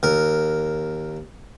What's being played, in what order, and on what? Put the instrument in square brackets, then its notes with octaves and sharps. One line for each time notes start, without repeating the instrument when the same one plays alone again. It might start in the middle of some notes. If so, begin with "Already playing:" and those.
[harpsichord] D#2 A#4